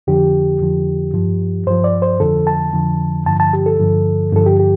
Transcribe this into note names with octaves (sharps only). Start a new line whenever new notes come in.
F2 D3 F3 G4
F2 D3 F3
G2 F3
G2 F3 C5
D5
C5
F2 D3 F3 A4
A5
F2 D3 F3
G2 D3 F3 A5
A5
G4
A4
G2 D3 F3
G2 D3 F3 A4
G4
G4